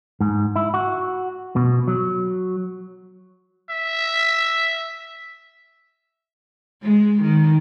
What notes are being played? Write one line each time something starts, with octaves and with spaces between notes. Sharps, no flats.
G#2
E4
F#4
B2
F#3
E5
G#3
D#3